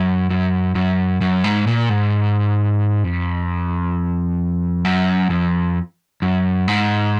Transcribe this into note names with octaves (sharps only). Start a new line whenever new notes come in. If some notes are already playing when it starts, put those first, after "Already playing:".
Already playing: F#2
F#2
F#2
F#2
G#2
A#2
G#2
F2
F#2
F2
F#2
G#2